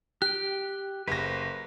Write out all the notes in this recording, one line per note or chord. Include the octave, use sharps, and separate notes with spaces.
G4 G5 F#6
F#1 B4 C5 A#6